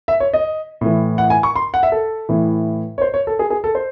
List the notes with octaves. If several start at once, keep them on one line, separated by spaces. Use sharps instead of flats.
E5
C#5
D#5
A2 E3
F#5
G#5
C#6
C6
F#5
E5
A4
A2 E3
C#5
C5
C#5
A4
G#4
G#4
A4
C5